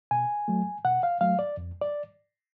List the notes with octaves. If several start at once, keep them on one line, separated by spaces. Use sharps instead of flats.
B2 G#5
F#3 A3
B2 F#5
F5
F#3 A3 F5
D5
F2
D5